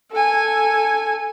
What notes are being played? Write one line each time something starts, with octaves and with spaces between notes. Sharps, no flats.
A4 G#5